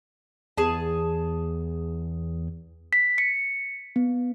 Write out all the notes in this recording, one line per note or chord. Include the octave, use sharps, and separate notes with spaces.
E2 G#4 A5
B6
C#7
B3